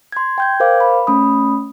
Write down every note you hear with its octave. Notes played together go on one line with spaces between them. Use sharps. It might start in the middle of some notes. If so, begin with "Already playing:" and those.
C6 G#6
G5 G6 G#6
A#4 C5 F5 D6
B5
A3 C#4 B5 D#6